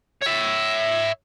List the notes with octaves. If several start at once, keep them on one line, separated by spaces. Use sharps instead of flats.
C#5 E5